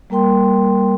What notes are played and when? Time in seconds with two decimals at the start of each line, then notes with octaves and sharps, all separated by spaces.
0.10 G3 A#3 A#4 G5 C6